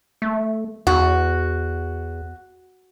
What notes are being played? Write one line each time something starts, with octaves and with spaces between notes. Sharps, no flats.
A3
E2 F#4